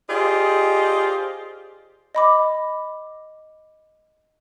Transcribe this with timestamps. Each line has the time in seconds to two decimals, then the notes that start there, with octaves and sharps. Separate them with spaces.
0.09 F4 G4 G#4 C5 D5 D#5
2.15 D#5 B5 D6